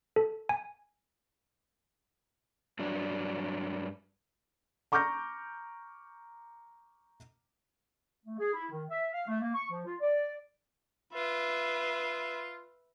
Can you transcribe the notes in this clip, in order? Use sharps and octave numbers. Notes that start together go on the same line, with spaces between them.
A4
G#5
G2 F#3 D4
A#5 C#6 D6 F6 G6 A#6
A3
G#4
E4
D#3
E5
F5
A3
A#3
C#6
F3
F4
D5
F4 B4 E5